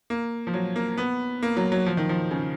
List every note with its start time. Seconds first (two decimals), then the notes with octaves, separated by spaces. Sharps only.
0.10 A#3
0.47 F3
0.53 F#3
0.76 A#3
0.97 B3
1.43 A#3
1.57 F#3
1.72 F#3
1.86 F3
1.97 D#3
2.09 F3
2.31 C#3